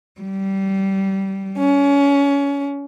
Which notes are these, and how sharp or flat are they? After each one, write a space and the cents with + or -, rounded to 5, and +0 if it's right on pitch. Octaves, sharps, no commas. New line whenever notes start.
G3 -20
C#4 +25